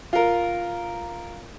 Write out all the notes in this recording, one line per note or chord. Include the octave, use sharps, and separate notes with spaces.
F4 A#4